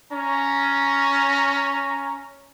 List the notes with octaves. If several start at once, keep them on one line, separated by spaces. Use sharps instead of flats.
C#4 A#5